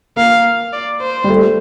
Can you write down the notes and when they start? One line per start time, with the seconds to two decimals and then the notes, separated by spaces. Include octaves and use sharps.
0.16 A#3 F5
0.73 D5
1.02 C5
1.24 G3
1.30 A3